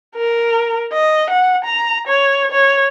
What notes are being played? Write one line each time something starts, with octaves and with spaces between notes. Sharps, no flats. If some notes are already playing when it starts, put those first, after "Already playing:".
A#4
D#5
F#5
A#5
C#5
C#5